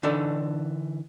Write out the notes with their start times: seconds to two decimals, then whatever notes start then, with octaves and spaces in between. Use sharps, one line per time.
0.03 D3 E3 D4 D#4 A4 C#5